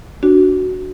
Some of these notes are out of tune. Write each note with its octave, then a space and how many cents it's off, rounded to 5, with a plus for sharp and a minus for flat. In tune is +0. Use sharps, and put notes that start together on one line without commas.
D4 +0 F#4 +0